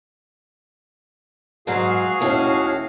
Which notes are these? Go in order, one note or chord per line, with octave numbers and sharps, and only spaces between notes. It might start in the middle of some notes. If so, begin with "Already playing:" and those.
G#2 F#3 F#4 G#4 F5
D#2 A2 C#4